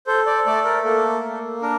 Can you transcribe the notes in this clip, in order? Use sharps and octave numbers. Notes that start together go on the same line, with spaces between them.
A4 C5
D5
A3 D5
A#4
A#3 A4
A#3
D4 A#4